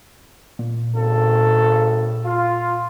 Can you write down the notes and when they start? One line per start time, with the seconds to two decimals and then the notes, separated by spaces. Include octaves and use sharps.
0.59 A#2
0.95 G#1 C#3 A4
2.25 F4